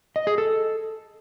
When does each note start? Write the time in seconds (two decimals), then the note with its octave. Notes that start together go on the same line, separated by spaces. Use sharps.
0.16 D#5
0.27 G#4
0.38 A4